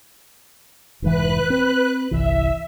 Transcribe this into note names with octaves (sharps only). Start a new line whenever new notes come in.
F1 G#2 E3 B4 F#6
C4
G1 C2 E3 E5